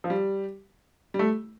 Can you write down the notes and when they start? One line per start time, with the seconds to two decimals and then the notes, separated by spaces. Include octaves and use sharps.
0.04 F3
0.10 G3
1.14 G3
1.19 A3